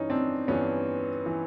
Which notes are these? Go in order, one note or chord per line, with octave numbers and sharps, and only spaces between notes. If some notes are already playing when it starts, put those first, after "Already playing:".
Already playing: G2 E3 C#4 D#4
C4 D4
G2 E3 B3 C#4
E3